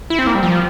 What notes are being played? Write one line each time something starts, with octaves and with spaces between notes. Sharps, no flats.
E4
C4
A#3
G3
F3